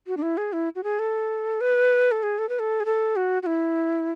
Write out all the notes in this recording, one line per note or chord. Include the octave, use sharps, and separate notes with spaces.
F#4
D4
E4
G#4
E4
F#4
G#4
A4
B4
A4
G#4
A4
B4
A4
G#4
A4
F#4
F#4
E4